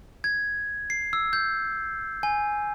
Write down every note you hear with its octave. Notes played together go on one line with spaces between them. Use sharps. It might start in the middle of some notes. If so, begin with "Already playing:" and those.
G#6
C7
E6
G6
G#5